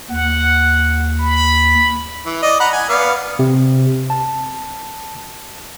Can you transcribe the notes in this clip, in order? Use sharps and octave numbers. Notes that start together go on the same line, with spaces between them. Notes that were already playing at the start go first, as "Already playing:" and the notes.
D#2 F#5
B5
E3
D5 D#5
F#5 A#5 B5
G#5
B3 D5 F5
C3
A5